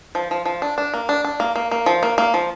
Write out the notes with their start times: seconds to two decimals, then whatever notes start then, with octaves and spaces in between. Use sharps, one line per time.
0.15 F3
0.31 F3
0.45 F3
0.62 D4
0.78 D4
0.94 A#3
1.09 D4
1.24 D4
1.40 A#3
1.56 A#3
1.71 A#3
1.86 F3
2.03 A#3
2.18 A#3
2.34 F3